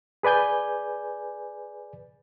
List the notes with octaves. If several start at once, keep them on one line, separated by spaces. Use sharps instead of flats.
G#4 B4 D5 G#5 G6